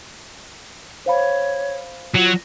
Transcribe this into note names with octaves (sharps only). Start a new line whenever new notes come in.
C5 C#5 F5 B5
F#3 F4